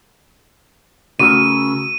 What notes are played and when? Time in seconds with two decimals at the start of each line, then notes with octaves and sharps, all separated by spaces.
1.19 C#3 A3 F#4 A#4 E6 D#7